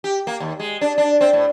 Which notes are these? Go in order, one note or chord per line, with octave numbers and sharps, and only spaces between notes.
G4
A#3
D#2
G#3
D4
D4
C4
A2